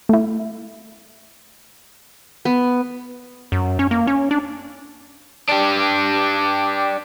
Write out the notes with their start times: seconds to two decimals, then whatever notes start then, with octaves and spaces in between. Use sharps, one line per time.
0.09 A3 E4
2.45 B3
3.52 F#2
3.79 C#4
3.91 A#3
4.07 C#4
4.31 D4
5.50 D4 G4